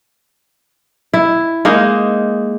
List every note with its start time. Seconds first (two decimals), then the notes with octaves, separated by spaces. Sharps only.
1.13 E4
1.65 G#3 A#3 D#4